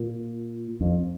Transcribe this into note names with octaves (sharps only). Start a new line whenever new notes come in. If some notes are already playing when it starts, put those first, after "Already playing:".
Already playing: A#2
F2